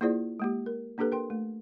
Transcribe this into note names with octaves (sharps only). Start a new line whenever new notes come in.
A#3 E4 F4 G#4 C5 D5
G#3 A#3 G4
A#4
A#3 D4 G4 A4 B4
A#4 G5 C6
A3